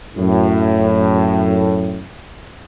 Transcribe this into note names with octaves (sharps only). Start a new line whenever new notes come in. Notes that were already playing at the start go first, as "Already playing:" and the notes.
F#2 A2